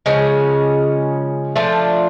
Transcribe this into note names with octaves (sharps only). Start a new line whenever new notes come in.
C#3 F3 G#3 C#4
F3 A3 D4 F4